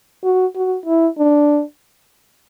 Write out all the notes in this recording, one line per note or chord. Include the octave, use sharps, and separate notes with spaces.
F#4
F#4
E4
D4